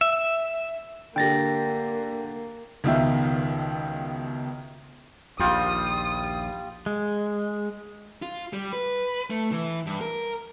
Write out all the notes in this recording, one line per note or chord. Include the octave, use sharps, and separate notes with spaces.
E5
D3 A#3 G4 G5 A6 A#6
C#2 B2 D#3 F4 E5
A#1 D#2 G3 F4 G5 D#6
G#3
F4
G3
B4
A3
E3
G2
A#4